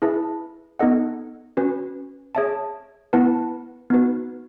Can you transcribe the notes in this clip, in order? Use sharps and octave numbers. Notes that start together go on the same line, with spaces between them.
E4 G#4 B4 E5 A5
B3 D#4 A4 D#5 F#5
C#4 F#4 B4
G#4 C#5 E5 A5
B3 E4 B4 F#5 A5
B3 D#4 F#4 B4